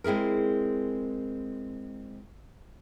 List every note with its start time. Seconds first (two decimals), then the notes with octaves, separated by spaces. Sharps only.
0.04 G#3 C4 E4 G#4 A#4